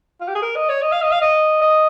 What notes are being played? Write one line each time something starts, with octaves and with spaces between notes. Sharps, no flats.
F4
G4
G#4
A#4
D#5
C#5
D#5
F5
D#5
F5
D#5
D#5